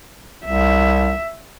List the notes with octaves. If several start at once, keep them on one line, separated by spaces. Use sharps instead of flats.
C2 E5